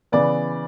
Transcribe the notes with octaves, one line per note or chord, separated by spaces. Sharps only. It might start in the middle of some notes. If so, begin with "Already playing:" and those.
C#3 E3 B3 D5